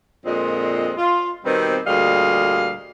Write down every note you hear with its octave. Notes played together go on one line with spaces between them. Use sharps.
F2 A#2 G#3 C4 D4 D#5
F4
B2 D#3 G3 B3 C4
D2 A#2 G3 G#4 D#5 F5